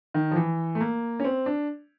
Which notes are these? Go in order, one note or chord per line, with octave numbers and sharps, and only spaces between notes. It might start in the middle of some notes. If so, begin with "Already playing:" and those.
D#3
F3
E3
A3
A#3
C#4
C4
D4